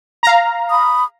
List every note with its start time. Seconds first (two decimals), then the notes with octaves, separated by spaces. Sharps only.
0.23 F5 A#5
0.70 B5 D#6